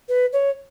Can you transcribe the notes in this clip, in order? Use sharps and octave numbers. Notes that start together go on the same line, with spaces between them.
B4
C#5